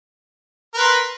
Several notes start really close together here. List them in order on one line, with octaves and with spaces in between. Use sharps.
A#4 B4 C6